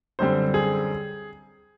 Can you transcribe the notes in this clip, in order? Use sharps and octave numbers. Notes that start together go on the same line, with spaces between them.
F#2 D3 G3 C4 C5
G#4